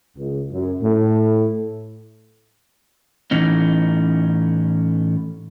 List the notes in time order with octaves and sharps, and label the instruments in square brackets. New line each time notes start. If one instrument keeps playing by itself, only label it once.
[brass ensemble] C#2
F#2
A2
[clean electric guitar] A2 E3 B3 C#4 D#4